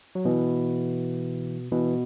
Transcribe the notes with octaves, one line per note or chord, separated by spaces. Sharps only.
F#3
B2 E3
B2 E3